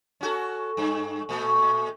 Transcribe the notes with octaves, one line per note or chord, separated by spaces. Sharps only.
C#4 F#4 A4
G2
A#2 A3